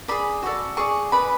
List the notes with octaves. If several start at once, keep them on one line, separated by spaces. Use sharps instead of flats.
G#4 D5 B5
F#4 A4 D5
G#4 D5 C#6
G#4 B4 D5 B5